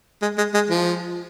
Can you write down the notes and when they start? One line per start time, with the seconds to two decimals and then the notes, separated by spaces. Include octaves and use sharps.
0.22 G#3
0.37 G#3
0.54 G#3
0.70 F3